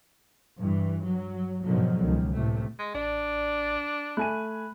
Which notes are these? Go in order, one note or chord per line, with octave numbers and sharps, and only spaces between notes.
G2 E3
F#3
G#2 B2 D3 D#3 F3 F#3
C#2 D#3
A2 C3 A3
G#3
A1 D4 D5
A3 G#5 B5 F#6 D#7